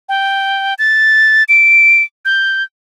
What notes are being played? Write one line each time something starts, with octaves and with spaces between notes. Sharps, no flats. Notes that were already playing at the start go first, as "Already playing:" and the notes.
G5
A6
D7
G6